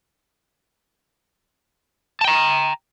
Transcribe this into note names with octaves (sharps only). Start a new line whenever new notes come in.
G5 A5 A#5